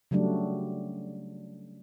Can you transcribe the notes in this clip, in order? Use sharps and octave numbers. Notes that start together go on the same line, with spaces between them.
C#3 F#3 G3 A3 D4